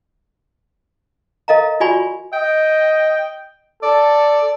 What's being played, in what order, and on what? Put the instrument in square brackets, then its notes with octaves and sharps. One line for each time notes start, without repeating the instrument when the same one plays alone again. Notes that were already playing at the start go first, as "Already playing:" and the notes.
[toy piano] A4 A#4 D#5 F5 A#5
F4 F#4 D5 G#5 B5 C#6
[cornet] D#5 [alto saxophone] G5
[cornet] A4 [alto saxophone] D5